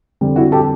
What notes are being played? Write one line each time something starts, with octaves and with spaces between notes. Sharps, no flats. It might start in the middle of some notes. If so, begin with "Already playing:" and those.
F2 D3 G3
E4 F#4
G4 A4